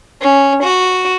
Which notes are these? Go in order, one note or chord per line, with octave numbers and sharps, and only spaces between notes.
C#4
F#4